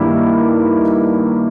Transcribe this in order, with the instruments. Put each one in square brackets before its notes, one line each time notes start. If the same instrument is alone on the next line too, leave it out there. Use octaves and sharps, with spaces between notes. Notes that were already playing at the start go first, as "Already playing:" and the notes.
Already playing: [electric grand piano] G2 D#3 G3 A#3 E4